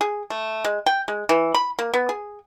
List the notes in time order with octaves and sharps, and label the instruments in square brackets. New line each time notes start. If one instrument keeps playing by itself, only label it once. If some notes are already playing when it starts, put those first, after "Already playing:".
[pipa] G#4
A3
G#3
G5
G#3
E3
B5
A#3
B3
G#4